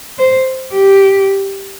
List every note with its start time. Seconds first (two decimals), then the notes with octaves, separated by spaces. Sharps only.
0.19 C5
0.73 G4